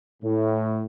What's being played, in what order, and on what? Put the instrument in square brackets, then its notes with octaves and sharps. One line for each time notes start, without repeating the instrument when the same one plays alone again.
[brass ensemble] A2